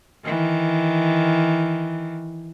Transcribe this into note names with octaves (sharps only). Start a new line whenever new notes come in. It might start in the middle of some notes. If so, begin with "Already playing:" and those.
D#3 E3